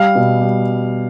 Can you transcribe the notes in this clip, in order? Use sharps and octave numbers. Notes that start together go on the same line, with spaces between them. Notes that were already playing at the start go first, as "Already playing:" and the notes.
Already playing: G3 F5
B2
G3